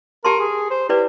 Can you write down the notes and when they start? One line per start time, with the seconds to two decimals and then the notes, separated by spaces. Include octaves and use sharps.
0.25 G4 A#4 A5 C6
0.40 G#4
0.71 C5
0.89 E4 G4 B4 D5